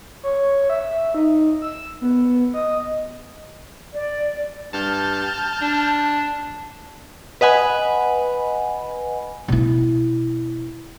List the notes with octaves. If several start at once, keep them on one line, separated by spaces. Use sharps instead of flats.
C#5
E5
D#4
E6
B3
D#5
D5
G2 A5 F6 G6
D4
B4 D#5 F#5 G#5 B5
B2 E4